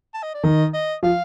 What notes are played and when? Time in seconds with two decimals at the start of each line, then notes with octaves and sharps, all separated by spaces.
0.14 A5
0.23 D#5
0.34 D5
0.44 D#3 D#5
0.73 D#5
1.03 F3 F5